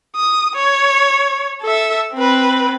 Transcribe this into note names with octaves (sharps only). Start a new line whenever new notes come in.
D#6
C#5
A4 E5
C4 B4